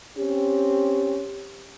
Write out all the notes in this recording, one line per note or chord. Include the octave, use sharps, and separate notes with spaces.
C4 C#4 G4